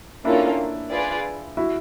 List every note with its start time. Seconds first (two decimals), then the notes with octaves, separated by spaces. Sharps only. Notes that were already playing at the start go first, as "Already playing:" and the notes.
0.25 A#3 C#4 D4 E4 F4 A4
0.91 F4 G#4 B4 D5
1.57 E4 F#4